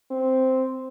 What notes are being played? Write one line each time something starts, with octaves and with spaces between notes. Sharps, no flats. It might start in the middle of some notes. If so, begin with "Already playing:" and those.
C4